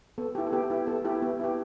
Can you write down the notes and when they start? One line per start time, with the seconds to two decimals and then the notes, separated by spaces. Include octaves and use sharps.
0.18 B3 A4
0.35 E4 G4
0.47 A4
0.52 B3 G4
0.70 E4 G4
0.87 B3 A4
1.05 E4 G4
1.22 B3
1.40 E4 G4